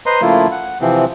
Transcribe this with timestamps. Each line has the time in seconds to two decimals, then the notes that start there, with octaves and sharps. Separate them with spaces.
0.06 B4 C5 D#5 A#5 C6
0.22 C#3 F3 A3 A#3 E4 F4
0.51 F#5
0.81 C3 E3 F3 C4